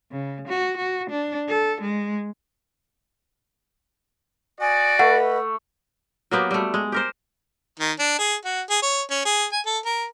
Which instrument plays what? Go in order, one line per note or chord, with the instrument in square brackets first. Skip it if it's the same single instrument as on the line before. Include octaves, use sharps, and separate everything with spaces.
[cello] C#3
F#4
F#4
D4
A4
G#3
[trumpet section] F#4 D5 [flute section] G#5 D#6
[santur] A3 [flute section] B4 D#5 B5 [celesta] F#5
[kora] F#3 A#3 B3 G4
G3 A3
G#3
G4 A#4 C5
[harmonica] D#3
D4
G#4
F#4
G#4
C#5
C#4
G#4
G#5
A4
A#4